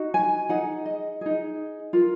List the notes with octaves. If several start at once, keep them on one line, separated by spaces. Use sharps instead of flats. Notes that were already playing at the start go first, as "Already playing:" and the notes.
Already playing: D#4 F#4
G#5
D#4 G#4 F#5
D#5
D#4 G#4
F4 A#4